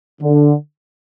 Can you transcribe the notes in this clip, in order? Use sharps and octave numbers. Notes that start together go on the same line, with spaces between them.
D3